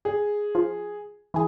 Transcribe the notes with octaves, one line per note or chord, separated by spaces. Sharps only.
G#4
F3
E3 G#4